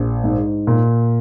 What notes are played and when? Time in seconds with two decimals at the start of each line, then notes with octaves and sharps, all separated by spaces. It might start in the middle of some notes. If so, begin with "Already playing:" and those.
Already playing: A#1
0.24 G#2
0.67 A#2